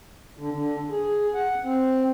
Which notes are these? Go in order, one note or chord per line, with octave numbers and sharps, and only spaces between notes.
D3
D3
G#4
F#5
C4